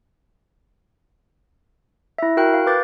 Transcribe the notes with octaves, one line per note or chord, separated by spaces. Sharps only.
E4 E5
F#4 A#4 G5 F#6
F5
B4 D6 G6 A6